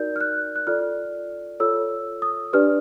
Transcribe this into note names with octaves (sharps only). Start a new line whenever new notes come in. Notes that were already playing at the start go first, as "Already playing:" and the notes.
Already playing: D#4 F#4 A#4 D5 G6
F6
F#6
F#6
F4 A4 D5 F6
F4 A4 C#5 E6
D#6
D4 G4 B4 D5 F6